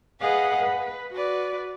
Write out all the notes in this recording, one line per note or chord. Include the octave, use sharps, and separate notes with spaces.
G#4 B4 D#5 F5 F#5
B4
F#4 B4 D5